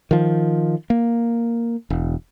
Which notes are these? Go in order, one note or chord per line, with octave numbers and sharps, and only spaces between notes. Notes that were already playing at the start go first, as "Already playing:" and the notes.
D#3 F3
A#3
E1